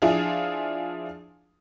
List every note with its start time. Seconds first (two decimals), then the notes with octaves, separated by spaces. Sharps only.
0.02 F3 D4 E4 F4 G#4